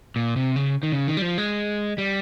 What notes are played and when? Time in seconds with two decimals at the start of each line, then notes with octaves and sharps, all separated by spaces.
0.16 A#2
0.36 C3
0.56 C#3
0.83 D#3
0.92 C#3
1.07 D#3
1.17 G3
1.22 F3
1.38 G#3
1.98 G3